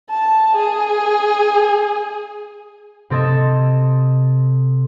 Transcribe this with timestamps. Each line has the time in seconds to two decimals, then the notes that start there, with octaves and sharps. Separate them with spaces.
0.10 A5
0.56 G#4
3.10 C3 C4 A4 D#5 G#6 E7